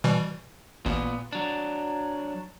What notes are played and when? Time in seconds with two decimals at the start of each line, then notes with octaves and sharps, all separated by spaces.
0.04 B2 E3 G3
0.86 A1 A#2 B3
1.33 F#3 D4